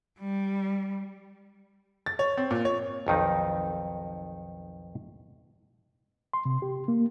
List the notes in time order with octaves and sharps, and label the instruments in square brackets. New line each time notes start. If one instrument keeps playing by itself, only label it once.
[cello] G3
[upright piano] A6
C#5
C4
A#2
C#5
[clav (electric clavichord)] B1 F2 D#3 D#4
[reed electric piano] C6
C3
G4
A#3